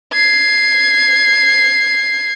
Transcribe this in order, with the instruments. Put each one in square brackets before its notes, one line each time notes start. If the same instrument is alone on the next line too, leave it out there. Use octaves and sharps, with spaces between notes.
[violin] G#6 C7